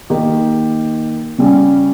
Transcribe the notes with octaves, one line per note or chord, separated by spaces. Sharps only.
D#3 A#3 D#4 G4
C#3 G3 C#4